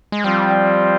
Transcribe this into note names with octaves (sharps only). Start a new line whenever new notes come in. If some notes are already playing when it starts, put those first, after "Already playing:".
G#3
F3 G3 C4 F4